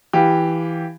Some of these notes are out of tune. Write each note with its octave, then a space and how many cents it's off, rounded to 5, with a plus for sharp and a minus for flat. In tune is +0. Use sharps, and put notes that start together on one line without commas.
E3 +0 G4 +0 F5 +0